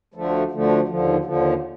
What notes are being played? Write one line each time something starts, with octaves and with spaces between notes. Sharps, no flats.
D2 D3 F3 A3
D2 D3 F3 A3
D#2 D3 F3
D#2 D3 F3